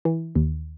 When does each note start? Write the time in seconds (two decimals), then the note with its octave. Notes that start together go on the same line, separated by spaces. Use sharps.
0.05 E3
0.35 D#2